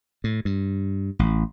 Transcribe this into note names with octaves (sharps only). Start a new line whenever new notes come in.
A2
G2
A1